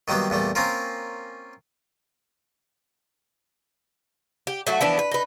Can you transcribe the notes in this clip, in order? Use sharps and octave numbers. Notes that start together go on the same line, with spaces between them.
D#3 F#3 G3 A#3 B3
E2 A#2 G3 A3
A#3 C4 C#4 F4 A#4
G4
F#3 A3 F#4
E3 F3 B3 D4
B4
D#4 B4